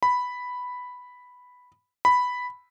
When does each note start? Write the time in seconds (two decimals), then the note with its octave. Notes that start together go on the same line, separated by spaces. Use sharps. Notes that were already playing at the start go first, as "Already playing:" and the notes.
0.03 B5
2.05 B5